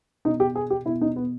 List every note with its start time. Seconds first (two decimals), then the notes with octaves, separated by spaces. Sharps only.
0.25 B2 D#4
0.40 G4
0.55 G#4
0.70 G4
0.86 B2 E4
1.01 D#4
1.16 B3